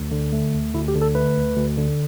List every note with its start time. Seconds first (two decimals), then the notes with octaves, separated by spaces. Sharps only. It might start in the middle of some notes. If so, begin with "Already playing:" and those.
Already playing: D2
0.11 D3
0.32 A3
0.53 D2
0.74 D2 E4
0.88 G4
0.95 D3
1.02 A4
1.15 A3 B4
1.36 D2
1.56 D2
1.77 D3